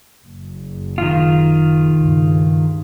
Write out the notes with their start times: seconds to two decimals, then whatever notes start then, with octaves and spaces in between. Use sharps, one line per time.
0.25 F#1
0.98 D#3 F4
1.95 C#2 G2